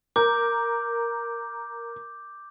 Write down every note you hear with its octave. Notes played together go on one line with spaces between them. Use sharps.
A#4 D6 G6